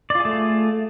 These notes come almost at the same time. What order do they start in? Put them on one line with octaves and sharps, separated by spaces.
D5 F4 G#4 A3